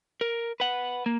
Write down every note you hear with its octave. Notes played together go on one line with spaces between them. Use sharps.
A#4
B4 F#5
A#3